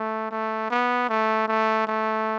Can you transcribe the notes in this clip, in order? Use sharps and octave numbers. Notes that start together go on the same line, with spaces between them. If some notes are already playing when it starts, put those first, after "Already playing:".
Already playing: A3
A3
B3
A3
A3
A3